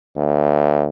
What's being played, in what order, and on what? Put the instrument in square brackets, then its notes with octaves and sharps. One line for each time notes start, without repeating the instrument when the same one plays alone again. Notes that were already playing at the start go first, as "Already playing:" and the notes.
[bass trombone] D2